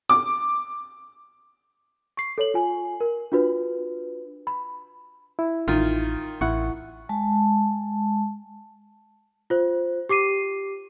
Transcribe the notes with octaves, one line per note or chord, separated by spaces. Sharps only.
D6
C#6 C7
A4 C#5 F#7
F4 G#5
A#4
D4 F4 F#4 B4
B5
E4
A1 D#3 F4
A1 E4 F#5 C#6
G#3 A5
F4 C5
G4 D6 C7 D#7